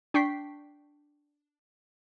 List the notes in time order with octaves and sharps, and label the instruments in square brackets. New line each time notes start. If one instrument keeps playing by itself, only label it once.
[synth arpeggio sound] D4 G5 C#6 B6 C7